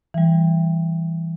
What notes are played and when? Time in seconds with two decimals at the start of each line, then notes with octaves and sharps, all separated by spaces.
0.14 E3 G3